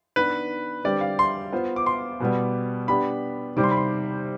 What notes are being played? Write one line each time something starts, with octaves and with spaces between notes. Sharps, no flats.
D#3 B3 D4 B4
D3 G3 C4 G4 B4 D5
F5
C6
B3 F4 C5 F5
D6
C6
B2 G3 B3
B3 D4 G4 B5
C3 D#3 G3 C4 D6
C6
B5
C6